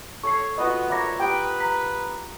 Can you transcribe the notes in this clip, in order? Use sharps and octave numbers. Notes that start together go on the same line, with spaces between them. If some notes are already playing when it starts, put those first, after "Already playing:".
A4 C#5 C#6 C7
B3 F4 F#4 B4 D#5
A#4 C#5 D5 E5 B5 D6 A#6
G4 B4 G5 D#6
A#5 B6